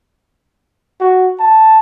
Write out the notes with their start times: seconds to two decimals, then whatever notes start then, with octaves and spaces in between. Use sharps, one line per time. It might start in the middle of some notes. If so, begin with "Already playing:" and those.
1.00 F#4
1.40 A5